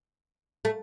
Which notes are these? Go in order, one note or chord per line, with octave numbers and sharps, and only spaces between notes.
A3